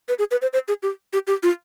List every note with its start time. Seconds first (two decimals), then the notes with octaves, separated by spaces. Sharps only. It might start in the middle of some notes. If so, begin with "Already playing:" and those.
0.09 B4
0.19 G#4
0.31 B4
0.42 C5
0.53 C5
0.68 G#4
0.83 G4
1.13 G4
1.27 G4
1.43 F4